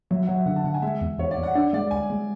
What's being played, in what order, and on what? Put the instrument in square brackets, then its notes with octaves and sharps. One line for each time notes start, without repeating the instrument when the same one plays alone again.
[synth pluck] F#3 [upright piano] E5
[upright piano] F#5
[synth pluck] F#3
[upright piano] E5
[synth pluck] D3 [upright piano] F#5
[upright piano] A5
[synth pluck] D3 [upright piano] F#5
[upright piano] G#5
[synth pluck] G#3 [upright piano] E5
[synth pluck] E2
[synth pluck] E2 [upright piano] C#5
[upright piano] D5
[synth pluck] E2
[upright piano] F#5
[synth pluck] D4 [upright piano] D5
[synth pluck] G#3 [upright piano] D5
[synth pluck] D2 [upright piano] G#5
[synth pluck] G#3